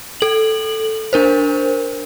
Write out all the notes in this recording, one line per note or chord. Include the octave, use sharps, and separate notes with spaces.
A4 F#7
D4 A#4 C5